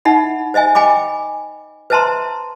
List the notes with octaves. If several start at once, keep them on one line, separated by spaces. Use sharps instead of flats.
D#4 E5 F#5 B5
C5 D#5 E5 G#5
G5 G#5 B5 D6
B4 C5 E5 A5 A#5 C6